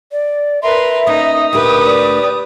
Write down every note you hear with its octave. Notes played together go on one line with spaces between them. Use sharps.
D5
A#4 B4 E5 C6
A#3 C#4 D#4 D#6
D2 A#2 G4 A#4 B4
D5